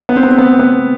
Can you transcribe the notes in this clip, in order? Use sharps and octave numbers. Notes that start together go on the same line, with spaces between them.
B3
C4
B3
C4
B3
B3